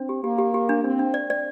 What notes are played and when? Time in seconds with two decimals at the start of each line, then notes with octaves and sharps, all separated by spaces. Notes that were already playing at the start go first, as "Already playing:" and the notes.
Already playing: C4 D4
0.09 G4
0.24 A#3 G4
0.38 G4
0.54 G4
0.69 D4
0.84 C4 D4
0.99 D4
1.14 D5
1.30 D5